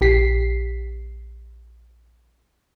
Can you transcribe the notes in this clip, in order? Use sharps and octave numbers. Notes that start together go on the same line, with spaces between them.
A#1 G4 B6 C7